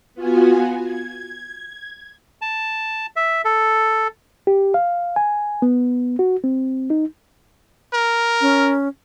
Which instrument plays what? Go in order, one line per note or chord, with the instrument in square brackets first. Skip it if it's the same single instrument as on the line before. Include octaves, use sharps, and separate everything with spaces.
[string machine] B3 F4 F#4 G#5
G#6
[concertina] A5
E5
A4
[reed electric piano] G4
F5
G#5
B3
F#4
C4
D#4
[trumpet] A#4
[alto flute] C#4